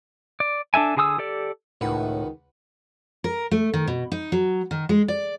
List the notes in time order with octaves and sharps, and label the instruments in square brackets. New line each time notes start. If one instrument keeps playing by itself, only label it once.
[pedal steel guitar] D5
D4 A4 E5 G#5
D3 G#4 G#5 D#6 E6
G4 A4 D5
[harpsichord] C#2 B4 F#5 [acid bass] A2 [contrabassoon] D#3
[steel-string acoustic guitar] A#4
A3
D#3
B2
D#4
F#3
D#3
G#3
D5